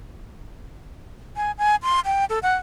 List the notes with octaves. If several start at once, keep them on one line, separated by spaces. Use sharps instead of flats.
G#5
G#5
C6
G5
A4
F#5